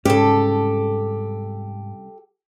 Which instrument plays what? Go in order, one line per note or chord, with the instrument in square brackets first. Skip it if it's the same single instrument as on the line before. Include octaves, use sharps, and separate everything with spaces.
[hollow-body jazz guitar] C2 C#3 C#4 [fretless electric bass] G#2 [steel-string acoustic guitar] G4 A4